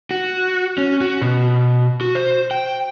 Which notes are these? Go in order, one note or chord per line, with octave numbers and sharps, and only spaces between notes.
F#4
C#4
F#4
B2
F#4
C5
G5